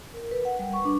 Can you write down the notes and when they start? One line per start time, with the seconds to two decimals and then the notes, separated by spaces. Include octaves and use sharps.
0.14 A#4
0.31 B4
0.45 F#5
0.59 G3
0.73 C#6
0.85 D4